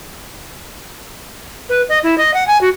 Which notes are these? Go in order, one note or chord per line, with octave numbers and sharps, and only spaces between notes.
B4
D#5
E4
D#5
F#5
G#5
F#4